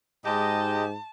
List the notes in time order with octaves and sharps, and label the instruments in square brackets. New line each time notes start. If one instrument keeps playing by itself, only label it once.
[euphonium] G#2 [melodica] G#3 [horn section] D#4 G4 D#5 [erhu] A5